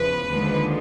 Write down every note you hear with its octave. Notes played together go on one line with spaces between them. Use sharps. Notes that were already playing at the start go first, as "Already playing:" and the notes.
Already playing: E2 C#3 F3 B4
D#2 D3 F3 G#3